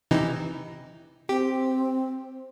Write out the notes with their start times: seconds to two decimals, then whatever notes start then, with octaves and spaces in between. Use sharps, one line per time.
0.11 C3 E3 D#4
1.29 C4 G4